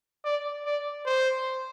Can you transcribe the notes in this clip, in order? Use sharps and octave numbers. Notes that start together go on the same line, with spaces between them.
D5
D5
C5